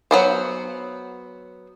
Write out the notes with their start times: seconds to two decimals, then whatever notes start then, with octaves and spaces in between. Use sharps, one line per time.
0.11 F#3 B3 C5